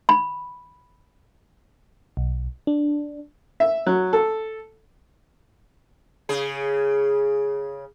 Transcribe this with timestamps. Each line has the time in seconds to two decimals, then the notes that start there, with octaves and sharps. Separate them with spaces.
0.09 B5
2.17 B1
2.67 D4
3.60 E5
3.87 F#3
4.13 A4
6.29 C#3 G#4